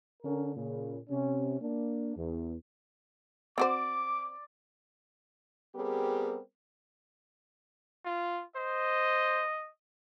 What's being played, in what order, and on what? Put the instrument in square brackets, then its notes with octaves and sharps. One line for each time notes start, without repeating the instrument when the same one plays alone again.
[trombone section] D3 C#4 A#4
A#2 C#3
C3 C#4
A#3 D4
E2
[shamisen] C4 F#4 C5 [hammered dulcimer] D5 [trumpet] D6
[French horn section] G3 B3 C4 G4 G#4 A#4
[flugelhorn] F4
[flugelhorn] C5 [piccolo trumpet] D#5